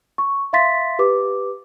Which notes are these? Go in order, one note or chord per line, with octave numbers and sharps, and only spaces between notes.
C#6
E5 F5 C6 A6 B6
G4 B4 D6